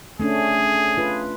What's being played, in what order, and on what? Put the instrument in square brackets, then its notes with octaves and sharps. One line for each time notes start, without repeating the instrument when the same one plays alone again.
[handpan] A3 C#4 D4 [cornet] G#4
[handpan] F4 B4